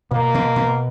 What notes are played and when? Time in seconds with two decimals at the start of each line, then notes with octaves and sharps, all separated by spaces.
0.11 B2 A#3
0.34 B2
0.56 B2